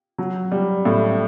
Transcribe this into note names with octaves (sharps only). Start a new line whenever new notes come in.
F#3
G3
A2